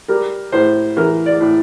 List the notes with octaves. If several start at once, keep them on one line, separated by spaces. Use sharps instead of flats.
G3 A#4
A2 C5
E3 A#4
D5
A2